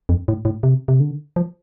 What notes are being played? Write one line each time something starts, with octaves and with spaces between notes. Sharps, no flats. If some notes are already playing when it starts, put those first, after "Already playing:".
F2
A2
A2
C3
C3
D3
F3